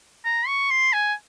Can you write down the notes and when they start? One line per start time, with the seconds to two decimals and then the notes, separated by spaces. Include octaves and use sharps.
0.25 A#5
0.47 C#6
0.70 C6
0.93 G#5